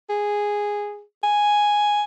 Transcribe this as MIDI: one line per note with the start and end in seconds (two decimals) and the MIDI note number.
0.10 1.02 68
1.24 2.04 80